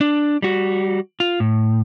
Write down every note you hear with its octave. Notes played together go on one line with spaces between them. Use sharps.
D4
G3 F#4
F4
A2